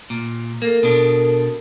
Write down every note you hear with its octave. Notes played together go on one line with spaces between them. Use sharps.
A#2
A#3 A4 A#4
B2 D4